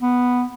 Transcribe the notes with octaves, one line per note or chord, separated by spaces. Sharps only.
B3